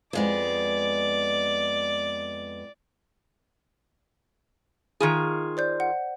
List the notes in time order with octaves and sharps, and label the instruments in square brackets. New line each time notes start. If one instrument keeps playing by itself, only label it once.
[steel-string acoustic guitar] F2 G#3 B3 [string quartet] D5
[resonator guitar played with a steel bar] D#3 F4 G#4
[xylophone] C5 D5 G6
F#5